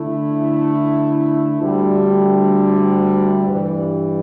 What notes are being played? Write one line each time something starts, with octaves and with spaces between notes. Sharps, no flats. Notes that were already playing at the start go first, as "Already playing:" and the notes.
Already playing: D3 A3 E4
D2 D3 G3
G2 E3 G3